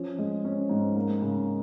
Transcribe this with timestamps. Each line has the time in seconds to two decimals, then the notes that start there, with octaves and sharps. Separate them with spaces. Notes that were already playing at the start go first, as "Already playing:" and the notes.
Already playing: F3 C#4
0.18 G#3
0.45 C#4
0.69 G#2
0.96 A#3
1.22 C#3